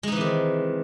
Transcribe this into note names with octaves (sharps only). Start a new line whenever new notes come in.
C3 D#3 E3 G#3 D#4